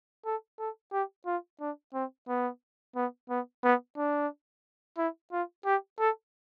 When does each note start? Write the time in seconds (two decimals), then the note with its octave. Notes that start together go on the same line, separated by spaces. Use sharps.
0.26 A4
0.59 A4
0.93 G4
1.26 F4
1.61 D4
1.94 C4
2.28 B3
2.96 B3
3.30 B3
3.64 B3
3.97 D4
4.98 E4
5.32 F4
5.66 G4
6.00 A4